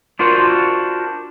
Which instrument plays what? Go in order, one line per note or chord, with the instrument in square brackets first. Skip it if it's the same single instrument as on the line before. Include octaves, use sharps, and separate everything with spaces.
[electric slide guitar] D4 F4 F#4 A#4 C5